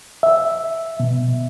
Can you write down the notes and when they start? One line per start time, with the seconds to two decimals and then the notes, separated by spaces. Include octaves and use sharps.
0.23 E5
1.00 B2